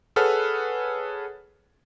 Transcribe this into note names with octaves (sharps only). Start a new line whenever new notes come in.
G#4 A4 B4 C#5 F#5 F6